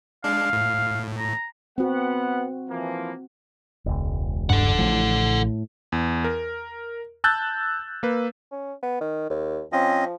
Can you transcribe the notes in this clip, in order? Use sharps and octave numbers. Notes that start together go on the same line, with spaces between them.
G#3 D4 F5
A2
A#5
B3 C4 F#4 F#5
E3 F3 A#3
E1 C#2
G2 A4 F#5
A1 A2 F3
E2
A#4
A5 E6 F#6 G6 A6
A#3 B4
C#4
B3
D#3
D#2
F3 C4 C#4 D#5